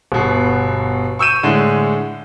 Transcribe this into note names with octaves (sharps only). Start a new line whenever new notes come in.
G1 B2
C#6 E6 G6 D#7 E7
A2 D3 G#3